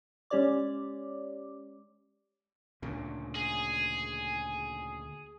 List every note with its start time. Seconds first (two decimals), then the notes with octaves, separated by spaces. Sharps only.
0.30 G#3 C#4 G4 C#5 D5 D6
2.82 D2 A#2 C#3
3.35 G#4